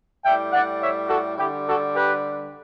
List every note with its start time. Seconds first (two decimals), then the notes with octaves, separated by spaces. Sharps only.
0.24 A2 G3 E5 G5
0.52 D5 F#5
0.80 C#5 E5
1.08 F#4 A4
1.37 D3 G3 E4 G4
1.65 F#4 A4
1.93 G4 B4